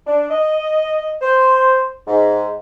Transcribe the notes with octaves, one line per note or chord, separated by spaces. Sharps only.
D4
D#5
C5
G#2